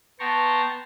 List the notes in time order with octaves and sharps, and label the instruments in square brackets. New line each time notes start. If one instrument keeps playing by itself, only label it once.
[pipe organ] B3 G5 A5 A#5 C6 C#6